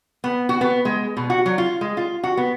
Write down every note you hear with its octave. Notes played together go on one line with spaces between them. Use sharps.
B3
F#4
B3
G#3
B2
F#4
F#3
F4
G#3
F4
F#4
B3